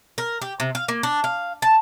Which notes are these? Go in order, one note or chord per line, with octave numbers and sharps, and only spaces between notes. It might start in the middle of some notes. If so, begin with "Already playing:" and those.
A#4
G4
C3
F5
A#3
D4
F5
A5